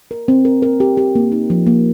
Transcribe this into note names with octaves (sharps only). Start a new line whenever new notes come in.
A#4
C4
A#4
A#4
G4
G4
A#3
D#4
F3
A#3